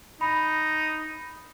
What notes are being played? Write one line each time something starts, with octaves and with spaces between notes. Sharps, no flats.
D#4 B5